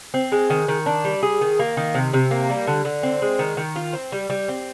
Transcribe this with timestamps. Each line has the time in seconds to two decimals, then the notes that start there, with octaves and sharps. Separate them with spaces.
0.14 C4
0.32 G#3
0.50 D#3
0.68 D#3
0.86 D4
1.05 G3
1.23 G#4
1.41 D#3
1.59 A#3
1.77 D#3
1.94 C3
2.13 C3
2.31 A#3
2.50 G3
2.67 D3
2.85 D3
3.03 C4
3.22 G#3
3.39 D#3
3.57 D#3
3.76 F4
3.93 C4
4.12 G3
4.30 G3
4.49 C4